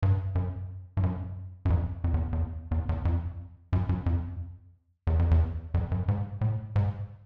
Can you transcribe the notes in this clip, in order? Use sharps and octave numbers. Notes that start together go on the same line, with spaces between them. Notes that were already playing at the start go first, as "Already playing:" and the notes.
G2
F#2
G2
F#2
F#2
F2
F2
E2
E2
E2
E2
F2
F#2
F#2
F2
E2
F2
E2
F2
F#2
G#2
A2
G#2